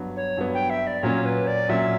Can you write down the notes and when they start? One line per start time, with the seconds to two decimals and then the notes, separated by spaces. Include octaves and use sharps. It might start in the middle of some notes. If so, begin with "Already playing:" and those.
Already playing: G2 F#3 B3
0.16 C#5
0.37 G2 F#3 B3
0.53 G5
0.69 E5
0.86 D5
1.02 A#2 F#3 A#3 C#4 C#5
1.25 B4
1.47 D5
1.69 A#2 F#3 A#3 C#4 E5